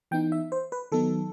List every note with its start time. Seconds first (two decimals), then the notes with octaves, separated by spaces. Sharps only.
0.11 E3 B3 D#4 G5
0.32 E5
0.52 C5
0.72 B4
0.92 D#3 F#3 B3 D#4 A4